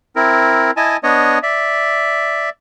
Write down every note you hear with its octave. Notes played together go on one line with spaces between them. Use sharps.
C4 E4 A#4
E4 D#5 G#5 A5
B3 D4 C#5 D#5
D5 E5